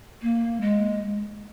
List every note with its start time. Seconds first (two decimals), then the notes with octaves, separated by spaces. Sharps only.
0.22 A#3
0.61 G#3